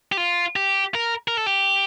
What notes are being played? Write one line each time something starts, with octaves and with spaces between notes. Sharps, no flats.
G4
F4
G4
A#4
A#4
A4
G4